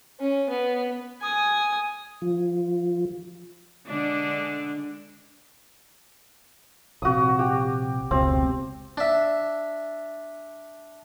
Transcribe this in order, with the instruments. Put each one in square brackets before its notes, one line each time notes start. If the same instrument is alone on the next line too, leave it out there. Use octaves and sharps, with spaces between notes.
[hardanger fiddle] C#4
B3
[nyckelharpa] G#5 D#6
[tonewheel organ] F3
[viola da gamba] D3 G#3 D4
[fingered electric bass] A#1 C3 [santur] F#4 D#6
[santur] G4
[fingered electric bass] F1 C#2 B2 [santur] C4
[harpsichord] D4 E5